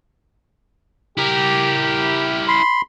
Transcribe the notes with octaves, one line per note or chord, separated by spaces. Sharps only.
E4 G4 A#4
B5 C6